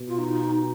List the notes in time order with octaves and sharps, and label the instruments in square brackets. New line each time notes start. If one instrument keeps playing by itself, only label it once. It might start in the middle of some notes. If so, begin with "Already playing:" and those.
Already playing: [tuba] B2
[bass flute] F4
D#4